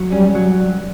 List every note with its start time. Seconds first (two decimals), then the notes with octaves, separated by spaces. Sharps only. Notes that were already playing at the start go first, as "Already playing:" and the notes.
Already playing: F#3
0.12 G3 C#4
0.35 F#3